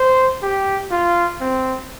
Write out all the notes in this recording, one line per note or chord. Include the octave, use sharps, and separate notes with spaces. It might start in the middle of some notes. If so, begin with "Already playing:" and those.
Already playing: C5
G4
F4
C4